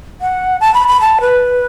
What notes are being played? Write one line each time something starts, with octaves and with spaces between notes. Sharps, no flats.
F#5
A5
B5
B5
A5
B4